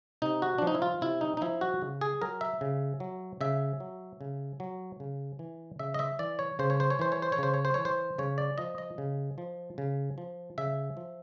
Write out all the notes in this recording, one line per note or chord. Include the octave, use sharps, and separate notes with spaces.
C3 D#4
F#4
D4
F3
D#4
E4
F4
C3 E4
D#4
D#4
F3 E4
F#4
C#3
G#4
F#3 A#4
E5
C#3
F#3
C#3 E5
F#3
C#3
F#3
C#3
E3
C#3 E5
D#5
E5
E3 D5
C#5
C#3 C5
C#5
C5
C#5
E3 C5
C#5
C5
C#5
C#3 C5
C#5
C5
E3 C#5
C5
C#3 C#5
D5
F3 D#5
D#5
C#3
F3
C#3
F3
C#3 E5
F3